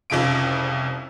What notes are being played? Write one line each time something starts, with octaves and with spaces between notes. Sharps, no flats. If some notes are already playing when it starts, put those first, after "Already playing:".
F1 C2 F2 C#3 F4 D7